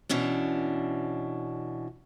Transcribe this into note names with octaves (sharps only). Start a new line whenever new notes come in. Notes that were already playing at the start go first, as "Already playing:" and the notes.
B2 E3 C#4 D4